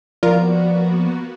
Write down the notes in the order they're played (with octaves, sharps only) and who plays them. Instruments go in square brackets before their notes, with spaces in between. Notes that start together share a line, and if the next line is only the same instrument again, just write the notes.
[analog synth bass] F3 [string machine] A#3 B3 F#4 [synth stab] F4 A#4 [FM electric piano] D5